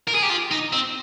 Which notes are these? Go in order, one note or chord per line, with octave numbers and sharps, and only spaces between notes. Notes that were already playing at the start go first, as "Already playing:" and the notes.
A#4
G#4
G4
F4
D#4
C4